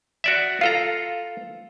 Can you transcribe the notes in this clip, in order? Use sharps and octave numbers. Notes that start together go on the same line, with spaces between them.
F#4 D5 E5
F4 A4 F5 A#5